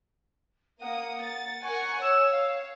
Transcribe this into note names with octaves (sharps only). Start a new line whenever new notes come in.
A#3 F#5 D#6
A6
A#4 F#5 G#5 C#6
C#5 E6
F5